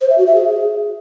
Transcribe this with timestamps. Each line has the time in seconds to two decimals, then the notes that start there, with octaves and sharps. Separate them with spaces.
0.01 C5
0.10 E5
0.18 F#4
0.27 E5
0.35 G#4